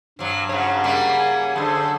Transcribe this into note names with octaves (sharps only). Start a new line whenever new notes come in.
G2 F#3 C4
G#2 C#3 C#5 F#5
C#3 G3 A#3
G#5
F#2 D3 G#4 A4 C5